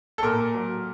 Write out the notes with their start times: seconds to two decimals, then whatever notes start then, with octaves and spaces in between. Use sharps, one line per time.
0.18 A4
0.23 A#2 A#4
0.54 F#3